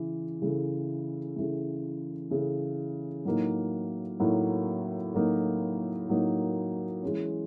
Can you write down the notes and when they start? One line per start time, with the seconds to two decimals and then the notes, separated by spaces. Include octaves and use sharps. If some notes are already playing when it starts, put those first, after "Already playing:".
Already playing: C#3 E3
0.42 C#3 E3 A3
1.36 C#3 E3 A3
2.30 C#3 E3 A3
3.25 A2 F#3 A#3 D#4
4.20 A2 F#3 A#3 D#4
5.14 A2 F#3 A#3 D#4
6.08 A2 F#3 A#3 D#4
7.03 E3 G#3 C#4